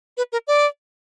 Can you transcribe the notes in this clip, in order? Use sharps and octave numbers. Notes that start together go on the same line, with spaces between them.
B4
A#4
D5